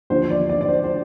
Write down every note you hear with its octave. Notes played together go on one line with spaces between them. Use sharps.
D#2 D3 F3 A#3 C5
D5
D5
D5
C5
C5